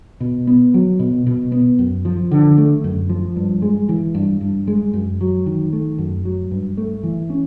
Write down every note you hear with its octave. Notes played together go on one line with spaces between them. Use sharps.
B2
B3
F#3
B2
B2
B3
F#2
F3
D3
A3
F#2
F3
G2
G#3
E3
G2
G2
G#3
F#2
F#3
D#3
A3
F#2
F#3
G2
A3
E3
C#4